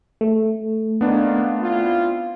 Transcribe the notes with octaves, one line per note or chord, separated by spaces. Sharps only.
A3
D#3 A#3 B3 D4
C4 E4 F4